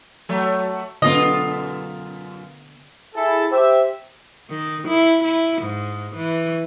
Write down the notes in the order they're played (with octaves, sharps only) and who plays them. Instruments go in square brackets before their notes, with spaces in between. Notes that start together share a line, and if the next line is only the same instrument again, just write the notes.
[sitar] F#3 A3
[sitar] F#2 F4 A#4 [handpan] D3 B3 [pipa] D#5
[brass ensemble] E4 G#4 A4
G4 C5 E5
[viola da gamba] D#3
E4
E4
G#2
E3